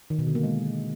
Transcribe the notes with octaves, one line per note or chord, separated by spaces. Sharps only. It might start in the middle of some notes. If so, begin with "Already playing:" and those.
D#3
B2
D3
A#3
G#3